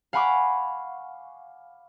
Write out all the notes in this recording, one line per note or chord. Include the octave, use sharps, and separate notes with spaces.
F5 F#5 G#5 B5 C#6 D6